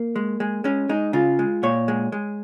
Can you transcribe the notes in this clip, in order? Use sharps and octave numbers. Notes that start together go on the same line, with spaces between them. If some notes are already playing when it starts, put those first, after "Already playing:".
Already playing: A#3
G#3
G#3
G#3 C#4
G#3 D#4
C#3 F4
G#3
A#2 C#5
G#3
G#3